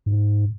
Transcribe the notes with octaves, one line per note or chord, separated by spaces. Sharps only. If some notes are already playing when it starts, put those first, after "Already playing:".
G#2